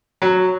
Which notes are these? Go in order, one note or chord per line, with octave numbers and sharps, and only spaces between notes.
F#3